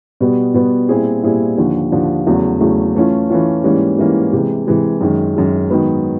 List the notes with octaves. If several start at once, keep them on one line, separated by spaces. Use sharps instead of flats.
B2 G3 B3
B2 G3 B3
A#2 G3 C4 E4 G#4
A#2 G3 C4 E4 G#4
D#2 D3 F3
D#2 D3 F3
E2 C#3 F#3 A3
E2 C#3 F#3 A3
E3 A3 C#4 F4
E3 A3 C#4 F4
G#2 E3 G3 A#3 C#4
G#2 E3 G3 A#3 C#4
C3 E3 G#3
C3 E3 G#3
F#2 D#3 G#3
F#2 D#3 G#3
G#2 D#3 F#3 B3